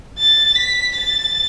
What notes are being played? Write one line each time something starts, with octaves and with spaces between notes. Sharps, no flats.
A6
B6
A6